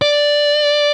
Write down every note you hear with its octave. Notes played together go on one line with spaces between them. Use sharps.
D5